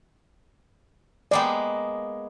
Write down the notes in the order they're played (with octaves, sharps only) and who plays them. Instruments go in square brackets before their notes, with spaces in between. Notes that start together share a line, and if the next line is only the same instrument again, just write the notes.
[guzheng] G#3 A#3 B3 [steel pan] D5 G5